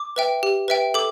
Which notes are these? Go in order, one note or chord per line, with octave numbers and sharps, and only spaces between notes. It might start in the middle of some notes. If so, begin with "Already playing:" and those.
Already playing: D6
B4 E5 G5
G4
B4 E5 G5
A4 D6